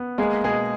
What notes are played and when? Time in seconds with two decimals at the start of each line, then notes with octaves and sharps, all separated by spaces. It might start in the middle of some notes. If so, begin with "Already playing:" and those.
Already playing: B3
0.18 G#3 A#3 G#4
0.44 B2 G#3 G#4